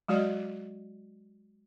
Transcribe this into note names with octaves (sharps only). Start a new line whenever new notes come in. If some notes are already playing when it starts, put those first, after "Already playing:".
F#3 G#3 F#4 D5 D#5